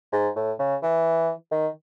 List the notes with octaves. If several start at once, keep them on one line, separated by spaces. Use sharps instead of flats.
G#2
A2
C#3
E3
D#3